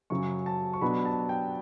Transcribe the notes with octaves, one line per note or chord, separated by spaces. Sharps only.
F#2 C#3 F#3 C#4 C#6
A5
C#6
B2 F#3 B3 D4 B5
A5
G5